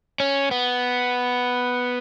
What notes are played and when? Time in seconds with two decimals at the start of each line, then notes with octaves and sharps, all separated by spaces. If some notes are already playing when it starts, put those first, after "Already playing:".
0.20 C#4
0.51 B3